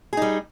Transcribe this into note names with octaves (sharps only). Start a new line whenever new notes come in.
G3 D#4 G#4